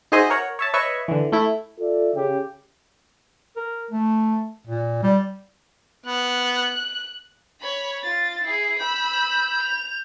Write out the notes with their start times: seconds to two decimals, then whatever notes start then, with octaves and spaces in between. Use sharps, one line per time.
0.12 D#4 F#4 G#4 C5 D#5 E5
0.30 A#4 C#5 F#5
0.59 C#5 E5 A5
0.74 B4 C#5 D#5 E5 C#6
1.08 D3 E3
1.32 A3 E4
1.79 F4 A4 D5 E5
2.14 C#3 G4
3.56 A#4
3.91 A3
4.67 A#2
5.03 G3
6.06 B3 F#6
7.61 C#5 B5
8.03 F4 A6
8.44 E4 G#4 C7
8.79 B5 E6 G6
9.63 F7